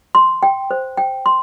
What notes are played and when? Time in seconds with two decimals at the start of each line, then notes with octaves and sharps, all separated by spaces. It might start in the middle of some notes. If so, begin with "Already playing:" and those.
0.15 C6
0.43 G5
0.71 C5
0.97 G5
1.26 C6